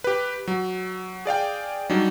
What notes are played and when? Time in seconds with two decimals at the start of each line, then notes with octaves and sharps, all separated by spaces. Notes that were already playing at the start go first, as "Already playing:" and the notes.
0.04 G4 B4
0.48 F#3
1.25 G#4 D5 F5 G5
1.90 F#3 G3 D4 D#4